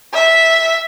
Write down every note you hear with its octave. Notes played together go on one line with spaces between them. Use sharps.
E5